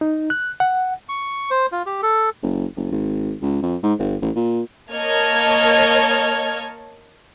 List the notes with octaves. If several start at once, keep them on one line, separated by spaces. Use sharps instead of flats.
D#4
F#6
F#5
C#6
C5
F4
G4
A4
F#1
F#1
G#1
C#2
F2
G#2
G1
A1
A#2
A#3 C#5 D#5 A5 F6 G#6